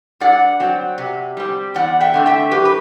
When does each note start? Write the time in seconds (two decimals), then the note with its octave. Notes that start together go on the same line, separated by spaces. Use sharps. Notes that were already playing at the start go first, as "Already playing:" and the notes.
0.20 G2 D5 F#5
0.60 F#3 C4
0.98 C3
1.37 G3 C4
1.74 E2 D5 F#5
2.00 E5 G5
2.14 D3 A3 C4
2.26 E5 G5
2.51 F#2 G4 B4
2.65 B4